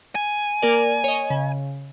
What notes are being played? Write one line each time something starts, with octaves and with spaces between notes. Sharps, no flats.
G#5
A#3 A#4 D5
C#5 D#5
C#3